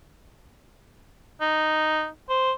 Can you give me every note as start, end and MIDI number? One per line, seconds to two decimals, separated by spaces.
1.41 2.08 63
2.29 2.52 72